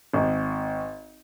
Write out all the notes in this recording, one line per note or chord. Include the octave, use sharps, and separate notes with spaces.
G#1